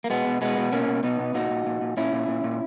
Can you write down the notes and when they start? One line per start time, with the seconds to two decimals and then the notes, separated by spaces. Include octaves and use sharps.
0.04 A#3
0.10 B2 G#3 B3
0.26 B2
0.41 B2 G#3 B3
0.57 B2
0.72 B2 A#3 C#4
0.88 B2
1.03 B2 B3 D#4
1.19 B2
1.34 A#2 D#4 F#4
1.50 A#2
1.66 A#2
1.81 A#2
1.97 A#2 C#4 E4
2.13 A#2
2.28 A#2
2.44 A#2